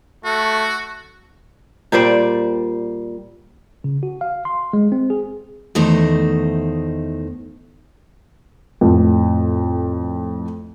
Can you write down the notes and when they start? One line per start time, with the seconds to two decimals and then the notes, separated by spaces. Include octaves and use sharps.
0.25 A3 F#4
1.92 A#2 G3 C5 D5
3.84 C#3
4.03 F#4
4.21 F5
4.45 C6
4.73 G#3
4.92 C4
5.10 G#4
5.75 E2 D#3 A3 D#4 C5 D#5
8.81 F2 A2